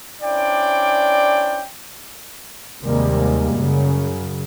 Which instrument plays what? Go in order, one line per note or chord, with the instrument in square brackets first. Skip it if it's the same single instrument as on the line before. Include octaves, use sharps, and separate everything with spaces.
[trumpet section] C#4 D4 E4 C5 D5 G5
[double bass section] D#2 C3 G3 G#3 A#3
F#2 C#3